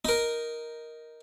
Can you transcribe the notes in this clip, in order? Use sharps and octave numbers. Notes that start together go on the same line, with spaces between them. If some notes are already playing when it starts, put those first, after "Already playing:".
D#4 A#4